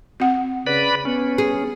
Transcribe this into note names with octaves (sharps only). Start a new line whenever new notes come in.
C4 F#5
C#3 B4 D5 B5
B3 C#4
G#4